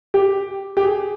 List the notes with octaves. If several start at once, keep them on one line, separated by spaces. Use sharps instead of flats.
G4
G4
G#4